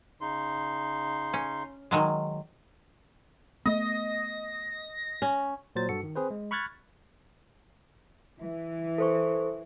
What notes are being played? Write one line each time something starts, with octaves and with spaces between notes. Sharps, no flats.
C#3 D#4 C6
C#4
D#3 F#3 G#3
A3 B3 D#5 A#6
C#4
A#2 F#3 C5 A6
G2 F#4 A4 C#7
D#3
C4 G#4 B4 C5
G#3
B5 C#6 F6 F#6 G#6 A6
E3
A4 C5 C#6